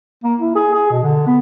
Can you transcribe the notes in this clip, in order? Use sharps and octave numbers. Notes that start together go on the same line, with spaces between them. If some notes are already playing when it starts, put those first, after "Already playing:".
A#3
E4
G#4
G#4
B2
D3
B3